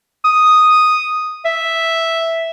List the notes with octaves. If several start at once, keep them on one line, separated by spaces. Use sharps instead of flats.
D#6
E5